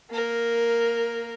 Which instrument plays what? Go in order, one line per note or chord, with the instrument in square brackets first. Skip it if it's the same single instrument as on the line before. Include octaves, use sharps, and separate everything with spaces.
[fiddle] A#3 A#4